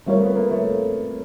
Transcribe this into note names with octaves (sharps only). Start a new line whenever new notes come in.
G3 A3 C4 F4 A#4 C#5
B3
A#3
A3